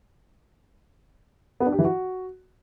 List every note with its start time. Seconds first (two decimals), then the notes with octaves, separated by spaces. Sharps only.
1.60 B3
1.66 D4
1.72 G4
1.79 E3
1.85 F#4